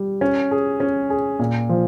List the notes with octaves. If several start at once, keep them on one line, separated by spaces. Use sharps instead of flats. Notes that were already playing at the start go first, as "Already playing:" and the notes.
Already playing: G3
C#4
G#4
C#4
G#4
A#2
F3